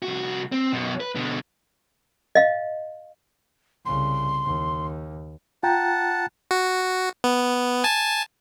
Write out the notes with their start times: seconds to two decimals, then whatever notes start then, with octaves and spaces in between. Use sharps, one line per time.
0.02 C2 F#4
0.52 C4
0.73 F#2 B2
1.00 B4
1.15 B2 D3
2.35 D#5 F5
3.86 C2 C#3 C6
4.44 D#2
5.63 F4 F#5 G5 A5 A#5
6.51 F#4
7.24 B3
7.84 G#5 A5